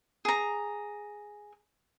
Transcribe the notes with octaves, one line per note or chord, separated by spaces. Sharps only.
G#4 A#5